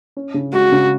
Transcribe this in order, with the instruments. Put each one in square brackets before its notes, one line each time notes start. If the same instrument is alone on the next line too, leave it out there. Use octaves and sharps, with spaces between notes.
[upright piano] C#4
C#3
[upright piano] G#3 [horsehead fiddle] F#4
[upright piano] C#3